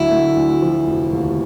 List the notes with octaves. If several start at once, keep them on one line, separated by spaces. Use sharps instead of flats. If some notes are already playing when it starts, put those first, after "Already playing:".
Already playing: D2 D3 F#3 A3 E4
A3
D2
F3
F1
D#2